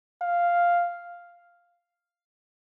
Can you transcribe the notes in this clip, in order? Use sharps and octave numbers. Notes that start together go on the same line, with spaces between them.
F5